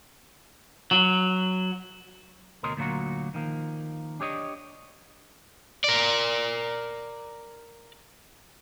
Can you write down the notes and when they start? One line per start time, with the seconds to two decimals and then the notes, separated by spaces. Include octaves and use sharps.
0.91 F#3
2.63 D2 B2 A#4 C#5 D#5 C6
2.77 D2 A#2 F#3 A#3 F#4
3.34 D#3 F3 A#3
4.20 D4 G4 C#5 D#5
5.84 A#4 D5